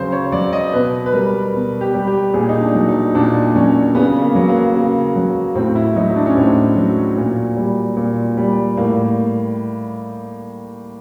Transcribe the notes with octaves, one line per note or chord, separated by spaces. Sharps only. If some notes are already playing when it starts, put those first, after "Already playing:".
Already playing: C#3 F#3 C5
C#5
F#3 D5
D#5
B2 B4
B4
G3 A#4
B2
G4
G3
G4
A#2 G#4
D#4
D4
F#3
D#4
A#2 D4
F#3 C#4
C#3 B3
A#3
F#3
A#3
C#3
F#3
A2 C4
E4
F#3 D#4
D4
C#4
A2 C4
F#3
A#2
G3
A#2
G3
A2 A#3